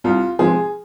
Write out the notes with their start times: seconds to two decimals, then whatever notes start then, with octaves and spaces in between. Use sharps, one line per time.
0.04 C2 F4
0.39 C3 F3 G#3 G#4